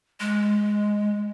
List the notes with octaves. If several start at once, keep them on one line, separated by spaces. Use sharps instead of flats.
G#3